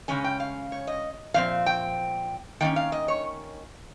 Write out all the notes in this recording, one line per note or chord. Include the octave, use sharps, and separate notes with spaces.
C#3 G#3 C#4 G#5
G5
F5
C#5
D#5
A#2 F3 C4 F5
G5
D#3 A#3 C#4 G5
F5
D#5
C#5